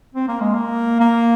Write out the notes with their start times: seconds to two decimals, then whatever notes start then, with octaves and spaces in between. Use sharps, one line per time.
0.15 C4
0.28 A#3
0.41 G#3
0.54 A#3
1.00 A#3